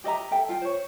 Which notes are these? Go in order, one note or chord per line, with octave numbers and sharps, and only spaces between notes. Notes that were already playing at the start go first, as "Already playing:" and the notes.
G4 D#5 E5 A#5
A4 E5 G5
F4 G5
C5 C#5